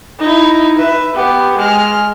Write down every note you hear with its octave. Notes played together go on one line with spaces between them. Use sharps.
D#4 E4
B4 E5
B3 G4
G#3 F6